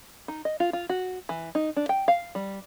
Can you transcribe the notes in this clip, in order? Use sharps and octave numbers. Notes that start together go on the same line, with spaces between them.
D#4
D#5
F4
F4
F#4
E3
D#4
D4
G5
F5
G3